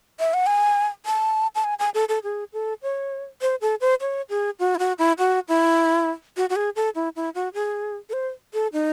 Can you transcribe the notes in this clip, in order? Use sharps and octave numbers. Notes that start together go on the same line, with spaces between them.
E5
F#5
G#5
A5
A5
G#5
G#5
A4
A4
G#4
A4
C#5
C5
A4
C5
C#5
G#4
F#4
E4
F#4
E4
F#4
E4
F#4
F#4
G#4
A4
E4
E4
F#4
G#4
A4
C5
A4
D#4